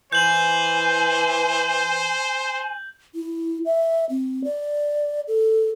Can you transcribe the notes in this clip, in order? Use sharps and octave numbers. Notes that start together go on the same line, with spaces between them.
E3 C5 G#5 G6 F#7
E4
E5
C4
D5
A4